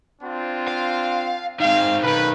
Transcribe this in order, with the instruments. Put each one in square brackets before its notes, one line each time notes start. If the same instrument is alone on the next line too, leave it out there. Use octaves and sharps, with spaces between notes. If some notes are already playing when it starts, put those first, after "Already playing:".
[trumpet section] C4 D4 F4
[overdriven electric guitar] F5
[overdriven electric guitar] D#3 C4 [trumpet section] G#3 F5
[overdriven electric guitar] B1 D#3 [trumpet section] B4